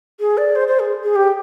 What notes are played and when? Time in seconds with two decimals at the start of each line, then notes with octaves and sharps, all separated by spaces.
0.20 G#4
0.38 D5
0.55 C5
0.68 C5
0.79 G#4
1.04 G#4
1.16 G4